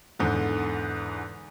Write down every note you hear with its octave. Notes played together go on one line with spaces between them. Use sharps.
E2 G#2 D3